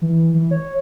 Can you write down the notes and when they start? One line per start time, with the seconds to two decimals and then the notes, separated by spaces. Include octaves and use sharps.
0.02 E3
0.34 E3
0.51 C#5